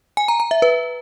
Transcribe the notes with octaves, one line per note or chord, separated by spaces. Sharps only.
G#5
A#5
A#5
E5
B4